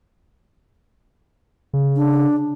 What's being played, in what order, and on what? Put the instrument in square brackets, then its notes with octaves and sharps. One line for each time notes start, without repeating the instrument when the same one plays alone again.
[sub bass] C#3
[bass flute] D4